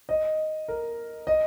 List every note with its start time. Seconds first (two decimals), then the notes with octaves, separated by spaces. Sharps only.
0.09 D#5
0.68 A#4
1.27 D#5